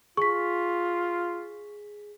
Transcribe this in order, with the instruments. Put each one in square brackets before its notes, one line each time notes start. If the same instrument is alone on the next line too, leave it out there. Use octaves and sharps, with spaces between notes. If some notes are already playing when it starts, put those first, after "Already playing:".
[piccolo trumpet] F4 [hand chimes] G#4 B6 [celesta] C#6